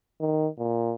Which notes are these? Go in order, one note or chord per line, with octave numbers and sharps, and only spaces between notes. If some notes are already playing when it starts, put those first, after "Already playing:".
D#3
A#2